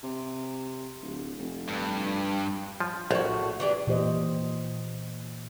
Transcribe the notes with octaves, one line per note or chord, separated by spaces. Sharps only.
C3
D1
F1
G2
F3
A#1 A2 F#4
E3 D4 G4
A#2 E3 G4 C5 D#5